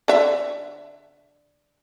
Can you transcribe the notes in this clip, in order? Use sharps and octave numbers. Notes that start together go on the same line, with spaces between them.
D3 E5